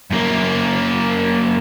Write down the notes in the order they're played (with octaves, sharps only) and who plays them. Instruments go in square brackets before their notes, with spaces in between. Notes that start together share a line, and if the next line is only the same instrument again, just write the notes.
[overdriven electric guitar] F#2 A#3